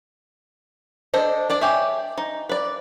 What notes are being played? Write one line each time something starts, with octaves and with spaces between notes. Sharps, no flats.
D4 A4 C5 D#5
D4 D5 A5
G4 G#4 C#5 E5
D#4
B4 D5